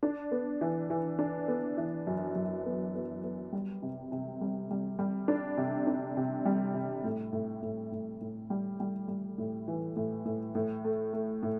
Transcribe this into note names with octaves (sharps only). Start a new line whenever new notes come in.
D4
B3
E3
E3
D4
B3
E3
F#2
F#2
B3
B3
B3
G3
C3
C3
G3
G3
G3
D4
C3
D4
C3
G3
C3
A2
A2
A2
A2
A2
G3
G3
G3
A2
E3
A2
A2
A2
A3
A3
A2